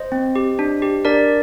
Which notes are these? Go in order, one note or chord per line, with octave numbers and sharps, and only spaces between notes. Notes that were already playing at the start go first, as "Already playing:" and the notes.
Already playing: C5 D#5
C4
G4
D4
G4
D4 A#4 D5